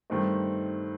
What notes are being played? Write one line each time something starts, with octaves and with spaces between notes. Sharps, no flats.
G2 D#3 A3 C4 D#4